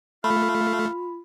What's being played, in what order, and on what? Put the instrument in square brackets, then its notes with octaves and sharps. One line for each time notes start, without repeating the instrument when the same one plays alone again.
[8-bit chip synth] A3 [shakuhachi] F4 [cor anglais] F5 [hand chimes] B5